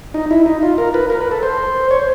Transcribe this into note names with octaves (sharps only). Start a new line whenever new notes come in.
D#4
E4
D#4
F4
A#4
B4
A#4
B4
A4
C5
C#5
C5